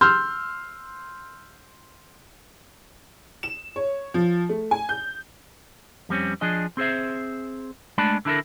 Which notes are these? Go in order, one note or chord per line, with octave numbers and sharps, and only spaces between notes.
C6 E6 F6 G6
E7
C#5
F3
A3
G#5
G6
F2 G3 C4 C#4
F3 D4 G#4 D#5
C4 G#4 C5 E5
G#3 A3 D4 D5 A5 B5
D3 D4 E4 A4 A#4